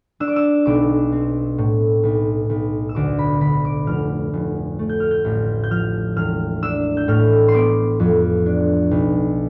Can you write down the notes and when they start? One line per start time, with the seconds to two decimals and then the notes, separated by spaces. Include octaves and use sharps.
0.20 D4 E6
0.28 D6
0.36 E6
0.66 B1 D6
1.12 C4
1.58 A2
2.03 B1
2.50 B1
2.89 E6
2.95 D2 D6
3.19 B5
3.41 D2 B5
3.65 D6
3.87 F1 F6
4.33 F1
4.79 A3
4.89 G6
5.00 F6
5.11 G6
5.25 A1
5.64 G6
5.70 F3 F6
6.16 E1 F6
6.63 D4 E6
6.97 G6
7.08 A2 F6
7.48 C6
7.54 B3 D6
8.00 F2
8.46 D4
8.91 B1